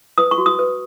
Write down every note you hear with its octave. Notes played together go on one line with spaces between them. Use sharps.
B4 D#6
C#6
F#4
D#6
B4